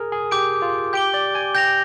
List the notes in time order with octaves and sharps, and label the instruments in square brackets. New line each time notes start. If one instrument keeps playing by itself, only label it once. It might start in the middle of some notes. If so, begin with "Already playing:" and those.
Already playing: [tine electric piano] G#4 A#4
G#4
[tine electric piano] G4 [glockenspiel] D6 G6 D7
[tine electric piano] F4
[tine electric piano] G4 [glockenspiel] G6 D7 G7
[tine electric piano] D5
G#5
[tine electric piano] G5 [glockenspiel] G6 A#6 F7